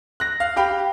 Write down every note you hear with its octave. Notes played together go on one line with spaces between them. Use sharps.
F#6 A#6
F5
G4 F5 G5 B5